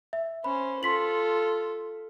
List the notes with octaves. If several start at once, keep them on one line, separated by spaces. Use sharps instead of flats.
E5
C#4 C5 B5
F4 A4 C6 B6 F#7